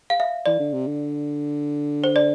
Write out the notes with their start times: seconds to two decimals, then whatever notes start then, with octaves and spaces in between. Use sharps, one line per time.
0.10 F5
0.20 E5
0.46 E3 D5
0.60 D3
0.73 C3
0.87 D3
2.04 C5
2.16 D5